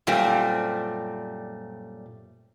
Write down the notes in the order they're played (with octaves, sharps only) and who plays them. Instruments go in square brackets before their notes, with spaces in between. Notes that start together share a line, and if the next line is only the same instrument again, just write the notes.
[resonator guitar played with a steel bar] F#2 A#2 G3 A3 C4